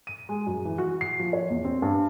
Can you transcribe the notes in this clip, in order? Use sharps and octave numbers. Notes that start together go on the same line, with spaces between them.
D#7
G#3
F#2
E3
F#4
C7
F3
C#5
E2
C4
G2